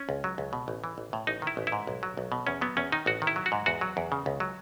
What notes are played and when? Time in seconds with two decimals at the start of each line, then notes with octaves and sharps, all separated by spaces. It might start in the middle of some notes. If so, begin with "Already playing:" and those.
Already playing: C#4
0.09 C#2
0.24 F#3
0.38 C#2
0.53 B2
0.68 A1
0.84 E3
0.98 A1
1.13 A2
1.27 A1 D#4
1.42 D#3 E4
1.57 A1
1.67 E4
1.72 G#2
1.87 B1
2.03 F#3
2.17 B1
2.32 B2
2.47 E2 C#4
2.61 F#3 B3
2.77 E2 C#4
2.92 D#3 D#4
3.06 A1 F#4
3.22 D#3
3.27 E4
3.36 F#3
3.46 F#4
3.52 G#2
3.66 E2 F#4
3.81 F#3
3.97 E2
4.12 C#3
4.26 C#2
4.40 F#3